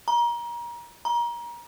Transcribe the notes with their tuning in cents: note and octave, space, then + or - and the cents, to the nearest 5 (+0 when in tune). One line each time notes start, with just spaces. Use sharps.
A#5 +30
A#5 +30